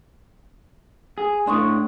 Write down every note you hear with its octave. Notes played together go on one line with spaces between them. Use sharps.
G#4
A2 D4 C6 C#6 D#6